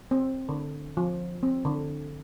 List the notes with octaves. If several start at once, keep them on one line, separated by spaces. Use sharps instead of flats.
C4
D3
F3
C4
D3